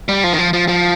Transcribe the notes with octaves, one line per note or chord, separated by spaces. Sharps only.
G3
F3
D#3
F3
F3
F3